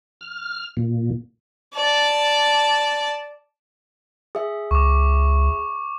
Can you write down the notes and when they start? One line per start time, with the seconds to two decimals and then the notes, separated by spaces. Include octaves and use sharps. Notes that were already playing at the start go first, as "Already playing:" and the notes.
0.21 F6
0.77 A#2
1.75 D5 A5
4.35 G#4 E5
4.71 C#2 C#6 D6